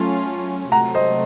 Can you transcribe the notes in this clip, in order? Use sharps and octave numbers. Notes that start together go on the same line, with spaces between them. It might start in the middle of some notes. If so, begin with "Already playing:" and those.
Already playing: F#3 A3 C#4 F4
C3 F#3 A3 F#5 A#5
C5 D#5